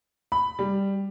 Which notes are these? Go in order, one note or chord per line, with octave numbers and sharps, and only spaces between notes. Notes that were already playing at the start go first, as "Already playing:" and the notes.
B5
G3